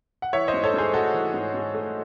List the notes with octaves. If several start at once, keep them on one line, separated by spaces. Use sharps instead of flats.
F#5
E3 C#5 E5
C5 D#5
G#2
A4 C#5
G#2 G#4 C5
A3 F#4 A4
E3
G#2
G#2
A3